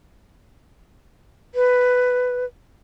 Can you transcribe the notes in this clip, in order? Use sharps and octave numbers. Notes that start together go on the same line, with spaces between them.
B4